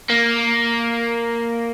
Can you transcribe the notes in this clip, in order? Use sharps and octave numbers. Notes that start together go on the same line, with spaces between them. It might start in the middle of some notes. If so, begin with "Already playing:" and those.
A#3